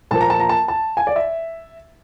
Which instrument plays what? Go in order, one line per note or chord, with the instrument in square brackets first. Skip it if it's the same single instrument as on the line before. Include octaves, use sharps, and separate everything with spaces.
[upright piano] A#2 F3 A#3 A5
A#5
A5
A#5
A5
A5
G#5
D5
E5